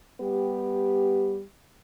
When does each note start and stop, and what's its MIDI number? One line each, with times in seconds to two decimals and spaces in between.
0.21 1.41 55
0.21 1.41 59
0.21 1.41 67